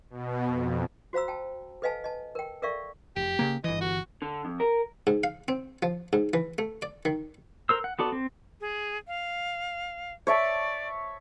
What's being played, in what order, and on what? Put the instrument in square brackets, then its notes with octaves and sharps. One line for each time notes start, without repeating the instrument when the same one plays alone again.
[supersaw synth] B2
F2
[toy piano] F#4 C5 F5 A#5 E6
G5 A5
A4 B4 D#5 F5 G#5 A5
D#5 A5
A#4 G5
A4 A#4 D5 E5 F5 C#6
[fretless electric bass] F1 [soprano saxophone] G4
[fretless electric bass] C#3 A#3
[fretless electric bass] G1 E3 [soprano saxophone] D#5
[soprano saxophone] F#4
[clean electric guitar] D3
F2
A#4
[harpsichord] G#2
F5
C4
F3
G#2
E3
A3
D5
D#3
[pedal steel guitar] A#4 C5 E6
F#5
B3 F#4 A4 D5
C4
[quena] G#4
F5
[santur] C#5 E5 A5 [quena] D5